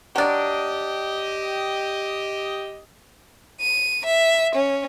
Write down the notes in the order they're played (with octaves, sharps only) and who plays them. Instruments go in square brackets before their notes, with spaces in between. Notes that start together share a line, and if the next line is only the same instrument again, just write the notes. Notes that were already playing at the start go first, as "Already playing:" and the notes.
[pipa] F#3 D4 [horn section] G4 D#5
[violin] D#7
E5
C#4